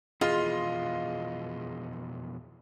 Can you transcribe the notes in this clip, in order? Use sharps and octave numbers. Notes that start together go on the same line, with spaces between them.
F2 B2 E3 F4 G#4 D#5 C6